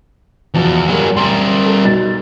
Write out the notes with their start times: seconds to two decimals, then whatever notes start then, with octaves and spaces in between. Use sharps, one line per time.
0.55 E2 B2 F3
0.88 F#3 G3 G#4 A#4
1.16 G3 A#4 C6
1.66 A4
1.84 B1 A6